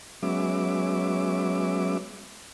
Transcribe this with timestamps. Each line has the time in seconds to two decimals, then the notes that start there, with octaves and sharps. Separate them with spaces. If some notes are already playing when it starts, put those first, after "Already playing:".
0.23 F#3 G#3 B3 C#4 E5 D6